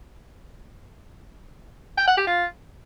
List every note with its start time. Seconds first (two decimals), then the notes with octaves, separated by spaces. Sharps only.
1.98 G5
2.07 F#5
2.17 G4
2.27 F4